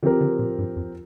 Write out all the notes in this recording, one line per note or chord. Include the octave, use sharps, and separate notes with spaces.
D3 F3 C4 G4 A#4
D3
A#2
G2
F2